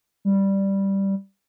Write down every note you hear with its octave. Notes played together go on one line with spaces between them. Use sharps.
G3